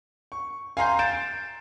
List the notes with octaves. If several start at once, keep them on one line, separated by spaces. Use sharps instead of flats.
C#6
F5 G#5 A#5 C6 G6 C7
G6 A6 D7 E7